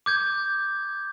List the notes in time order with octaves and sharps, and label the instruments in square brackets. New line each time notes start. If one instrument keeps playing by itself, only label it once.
[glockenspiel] D6 G6 G#6